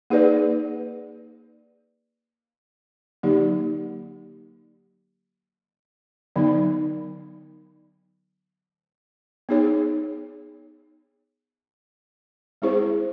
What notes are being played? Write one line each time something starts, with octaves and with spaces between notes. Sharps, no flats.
A#3 D#4 G#4 B4 D5
D3 F#3 A#3 D#4 G4
D3 F#3 B3 D#4
B3 D#4 G#4 C#5
G#3 C4 E4 G#4 C5